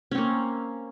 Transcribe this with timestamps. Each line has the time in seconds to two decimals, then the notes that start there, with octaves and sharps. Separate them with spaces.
0.11 C#4
0.15 C4
0.18 A#3